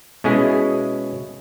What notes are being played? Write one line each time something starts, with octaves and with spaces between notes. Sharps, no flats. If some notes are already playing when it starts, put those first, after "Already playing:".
B2 G#3 C#4 E4 G#4